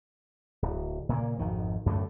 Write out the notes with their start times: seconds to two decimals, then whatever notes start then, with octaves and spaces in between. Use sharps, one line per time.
0.62 D1
1.09 A#2 C#3 F3 A#3
1.39 G#1 F2 D#3
1.86 F#2 A2 D3 A3